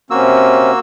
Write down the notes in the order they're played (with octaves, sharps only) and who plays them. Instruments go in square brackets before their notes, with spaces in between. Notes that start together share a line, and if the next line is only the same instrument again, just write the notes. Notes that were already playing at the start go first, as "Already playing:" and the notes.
[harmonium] C3 C4 C#4 [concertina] A#3 F#4 E6